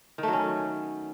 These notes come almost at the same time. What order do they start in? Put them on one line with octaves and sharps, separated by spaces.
D#3 A3 F#3 C#4